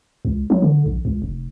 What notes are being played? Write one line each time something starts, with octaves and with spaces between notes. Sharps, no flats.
C#2
F#3
D3
A#1
C#2
F1